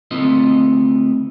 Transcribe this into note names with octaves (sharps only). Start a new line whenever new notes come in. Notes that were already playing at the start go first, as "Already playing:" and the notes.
D2 B3 C4 E4 F4 D#5